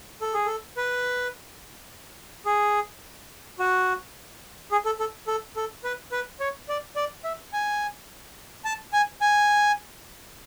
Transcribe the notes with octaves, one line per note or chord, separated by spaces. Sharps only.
A4
G#4
A4
B4
G#4
F#4
G#4
A4
A4
A4
A4
B4
B4
C#5
D5
D5
E5
G#5
A5
G#5
G#5